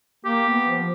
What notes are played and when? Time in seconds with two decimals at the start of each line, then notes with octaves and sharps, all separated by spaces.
0.25 A#3 G4
0.48 B3
0.68 F3